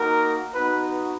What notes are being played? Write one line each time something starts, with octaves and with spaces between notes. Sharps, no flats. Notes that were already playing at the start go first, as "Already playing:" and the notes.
Already playing: A#3 D#4 F#4 A#4
B3 D#4 F#4 B4